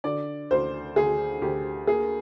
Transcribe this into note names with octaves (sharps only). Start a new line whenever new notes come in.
D3 D5
D2 C5
D2 G#4
D2 G4
A#3 G#4